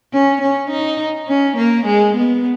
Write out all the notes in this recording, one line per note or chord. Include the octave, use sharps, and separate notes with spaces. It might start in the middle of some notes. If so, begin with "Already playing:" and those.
C#4
C#4
D#4
C#4
A#3
G#3
B3